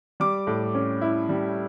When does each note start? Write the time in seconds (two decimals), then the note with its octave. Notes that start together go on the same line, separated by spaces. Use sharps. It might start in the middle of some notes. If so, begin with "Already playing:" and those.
0.20 G3 D6
0.47 A2
0.74 C#4
1.01 E4
1.29 G3